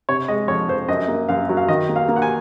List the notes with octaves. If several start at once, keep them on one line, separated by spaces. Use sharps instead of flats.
C3 C#5
G#3 D#5
F2 C#5
F2 C5
F#2 D#5
A#3
F#2 F5
F#3
F5
D#3 D#5
A#3
F5
A#3
F#5
G#5